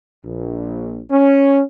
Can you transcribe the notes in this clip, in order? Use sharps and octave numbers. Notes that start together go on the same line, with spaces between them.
A#1
C#4